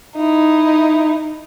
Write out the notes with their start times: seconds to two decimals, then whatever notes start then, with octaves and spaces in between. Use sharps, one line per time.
0.16 D#4 E4